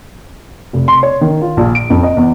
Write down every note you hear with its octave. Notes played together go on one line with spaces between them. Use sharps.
F1
C6
C#5
D#3
F4
A#1
D7
F2
D#5
E2